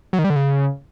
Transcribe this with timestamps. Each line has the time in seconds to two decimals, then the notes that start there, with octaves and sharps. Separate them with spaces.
0.13 F#3
0.19 D#3
0.24 G3
0.30 D3
0.36 C#3